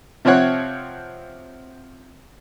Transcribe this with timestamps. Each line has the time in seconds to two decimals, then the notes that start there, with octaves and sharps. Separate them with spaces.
0.25 C3 F3 C4 C#5 F#5